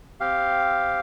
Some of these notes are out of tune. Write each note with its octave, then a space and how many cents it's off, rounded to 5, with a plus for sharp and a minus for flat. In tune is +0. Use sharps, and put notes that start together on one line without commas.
C4 +0 G4 +0 F5 +0